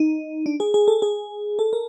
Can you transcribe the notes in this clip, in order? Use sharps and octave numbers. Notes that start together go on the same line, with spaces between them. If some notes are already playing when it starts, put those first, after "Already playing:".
Already playing: D#4
D4
G#4
G#4
A4
G#4
A4
A#4